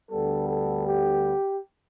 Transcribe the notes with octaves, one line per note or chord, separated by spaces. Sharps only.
D2 D3 G3 B3 A4
A4
G4